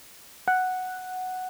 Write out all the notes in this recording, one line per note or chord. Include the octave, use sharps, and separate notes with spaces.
F#5